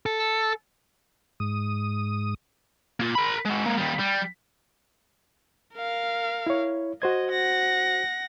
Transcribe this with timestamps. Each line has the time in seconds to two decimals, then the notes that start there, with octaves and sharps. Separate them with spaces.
0.06 A4
1.40 G#2 D#6
3.00 A#3 F4
3.15 A#4 B5
3.45 G#3 F#4
3.66 G#3 A#3
3.77 D#2 G3
3.99 G3
5.75 A#4 F5
6.47 E4 C#5
7.02 F#4 C5 D#5 G#6
7.31 F#5 A#6